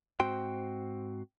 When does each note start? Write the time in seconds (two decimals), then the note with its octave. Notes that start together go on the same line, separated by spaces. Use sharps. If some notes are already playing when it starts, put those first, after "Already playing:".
0.20 G#2 C4 F#4 G5 C6